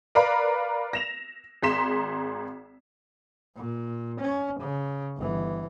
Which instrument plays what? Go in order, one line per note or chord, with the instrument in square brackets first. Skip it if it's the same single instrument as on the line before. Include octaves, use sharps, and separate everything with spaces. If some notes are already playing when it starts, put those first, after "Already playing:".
[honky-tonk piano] A#4 B4 D5 F5 A#5 B5
A#6 E7 F7
G#1 G#4 A#5 C6 B6 E7
[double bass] A#2
C#4
C#3
G1 E3